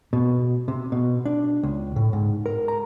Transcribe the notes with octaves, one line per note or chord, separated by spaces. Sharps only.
B2
C3
B2
D4
C#2
A2
G#2
A#4
A#5